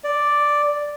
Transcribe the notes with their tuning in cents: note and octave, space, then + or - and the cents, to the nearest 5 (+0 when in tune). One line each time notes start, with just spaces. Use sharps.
D5 +0